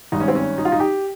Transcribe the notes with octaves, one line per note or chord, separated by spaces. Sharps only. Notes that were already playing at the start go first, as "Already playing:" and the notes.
G#1 G2 D#3 D#4
C#4
C4
C#4
D#4
F4
D#4
G4